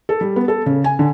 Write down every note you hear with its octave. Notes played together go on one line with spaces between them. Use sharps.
A4
G3
B3
A4
C#3
G#5
D3